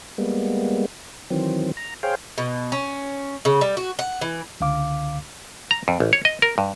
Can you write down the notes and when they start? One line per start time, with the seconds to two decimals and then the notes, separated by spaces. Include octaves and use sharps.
0.18 G3 G#3 A#3 B3
1.30 D#3 E3 F#3 C4
1.77 A#5
2.03 G#4 C5 C#5 F5 G5
2.38 B2
2.72 C#4
3.45 C#3
3.61 G3
3.77 F#4
3.99 F#5
4.21 E3
4.60 C#2 D3 F5 D6
5.71 A#5
5.88 F2
6.00 A1
6.13 C#5
6.25 D#5
6.42 A#4
6.58 G2